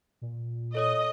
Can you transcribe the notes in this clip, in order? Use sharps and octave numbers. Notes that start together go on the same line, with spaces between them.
A#2
A4 C#5 D#5 D#6